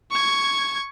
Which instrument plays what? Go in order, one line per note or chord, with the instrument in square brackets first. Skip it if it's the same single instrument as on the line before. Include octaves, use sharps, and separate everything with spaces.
[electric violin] C#6 G#6